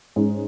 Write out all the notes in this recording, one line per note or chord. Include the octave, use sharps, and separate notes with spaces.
G#2 G#3 C#4